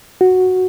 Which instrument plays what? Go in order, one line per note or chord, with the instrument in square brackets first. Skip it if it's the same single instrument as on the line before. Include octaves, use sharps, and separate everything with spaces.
[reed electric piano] F#4